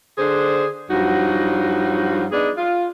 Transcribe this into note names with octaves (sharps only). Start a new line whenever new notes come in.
D3 D4 G#4 C5
G2 F3 F#3 D#4 F#4
B3 D4 D#4 G#4
F4